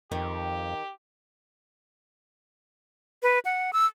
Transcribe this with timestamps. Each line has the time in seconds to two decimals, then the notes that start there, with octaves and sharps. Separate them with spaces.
0.12 F2 D#3 G4
3.23 B4
3.45 F#5
3.73 E6